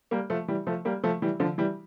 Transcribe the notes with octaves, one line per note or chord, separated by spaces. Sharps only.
G3 A#3
F3 A3
E3 G3
F3 A3
G3 A#3
F3 A3
E3 G3
D3 F3
E3 G3